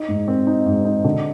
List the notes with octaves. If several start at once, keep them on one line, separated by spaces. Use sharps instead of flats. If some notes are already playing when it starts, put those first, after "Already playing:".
Already playing: D#4
G#2
C4
D#4
G#2
D#4
D3